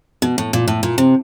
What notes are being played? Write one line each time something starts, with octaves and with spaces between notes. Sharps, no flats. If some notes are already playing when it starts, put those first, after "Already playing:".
B2
A2
A#2
A2
A#2
C3